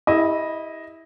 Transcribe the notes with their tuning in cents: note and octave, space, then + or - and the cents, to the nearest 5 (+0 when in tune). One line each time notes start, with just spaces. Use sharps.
E4 -20 G4 +35 D#5 +0